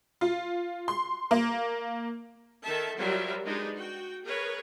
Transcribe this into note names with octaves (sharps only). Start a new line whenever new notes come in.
F4
C6
A#3
D#3 A4 E5 A5
F#3 G3 F4 A#4 C5 E5
G#3 D4 D#4 G4 B4
F#4 G5
G#4 A#4 B4 C#5